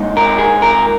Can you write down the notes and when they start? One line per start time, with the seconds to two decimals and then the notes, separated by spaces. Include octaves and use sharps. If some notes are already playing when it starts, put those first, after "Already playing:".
Already playing: A#2 G#3 D#4
0.17 A#4
0.38 G#4
0.62 A#4